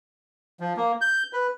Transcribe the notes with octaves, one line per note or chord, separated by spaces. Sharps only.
F3
A#3
G6
B4